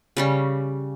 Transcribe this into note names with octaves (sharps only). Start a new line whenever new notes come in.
C#3 G3 C#4